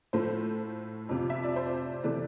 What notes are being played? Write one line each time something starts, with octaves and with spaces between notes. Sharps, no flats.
A2 F3 A3 C5
F2 C3 F3
E5
D5
C5
C3 E3 A3 D5